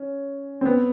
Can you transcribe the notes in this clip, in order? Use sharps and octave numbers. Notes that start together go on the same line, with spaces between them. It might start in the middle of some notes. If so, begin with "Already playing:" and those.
Already playing: C#4
C4
B3